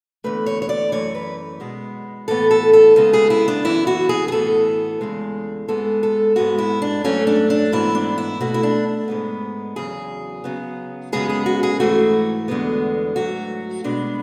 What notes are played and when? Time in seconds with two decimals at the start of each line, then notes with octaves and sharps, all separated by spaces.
0.24 E2 D3 A3 B4
0.46 C#5
0.62 C#5
0.69 D5
0.92 F#2 E3 A3 C#5
1.15 B4
1.60 B2 G#3 B3
2.28 A2 E3 B3 A4
2.51 A4
2.73 A4
2.96 C#3 G#3 B3 A4
3.13 G#4
3.30 E4
3.48 D4
3.65 F#2 E3 B3 E4
3.87 F#4
4.09 G#4
4.28 G#4
4.32 A2 E3 B3 A4
5.01 E2 C#3 G#3
5.68 G#2 G#3 B3 A4
6.03 A4
6.36 G#2 G#3 B3 F#4
6.58 E4
6.82 D4
7.04 G#2 F#3 A3 C#4
7.27 D4
7.50 D4
7.72 G#2 E3 B3 E4
7.95 D4
8.18 E4
8.40 B2 A3 F#4
8.54 E4
8.63 D4
9.08 G#2 G#3 B3
9.76 E2 C#3 F#3 G#4
10.44 C#3 F#3 B3
11.12 F#2 C#3 G#3 B3 G#4
11.29 G#4
11.46 F#4
11.63 G#4
11.80 G#2 E3 A3 F#4
12.48 E2 D3 G#3 B3
13.16 G#2 F#3 A3 F#4
13.84 B2 G#3 B3 D4